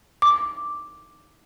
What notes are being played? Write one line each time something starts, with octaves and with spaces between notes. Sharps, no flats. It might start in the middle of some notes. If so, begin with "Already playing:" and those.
D6